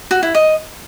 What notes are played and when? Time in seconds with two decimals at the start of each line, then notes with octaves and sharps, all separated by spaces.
0.11 F#4
0.23 E4
0.35 D#5